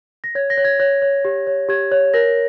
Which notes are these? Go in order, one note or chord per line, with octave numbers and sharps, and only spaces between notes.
A#6
C#5 G#6
A#6
C#5
G#6
C#5 A#6
C#5
G4
C#5
G4 G#6
C#5
A#4 A#6